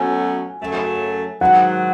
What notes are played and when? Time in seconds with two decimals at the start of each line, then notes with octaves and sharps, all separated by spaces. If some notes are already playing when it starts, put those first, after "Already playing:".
Already playing: B2 F#3 A3 C#4 F#4 G#5
0.60 F#2 C#3 F#3 A3
1.41 G#2 D#3 F#3 F#5